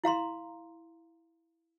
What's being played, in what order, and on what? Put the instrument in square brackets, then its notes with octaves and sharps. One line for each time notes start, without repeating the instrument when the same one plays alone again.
[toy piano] E4 F5 A#5 C6